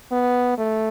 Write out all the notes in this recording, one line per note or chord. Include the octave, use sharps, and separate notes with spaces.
B3
A3